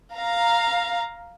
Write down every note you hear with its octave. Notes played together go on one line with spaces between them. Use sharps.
F5 A#5